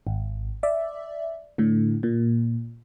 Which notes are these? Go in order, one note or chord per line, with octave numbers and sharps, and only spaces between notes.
G#1
D5 E5
A2 D3
A#2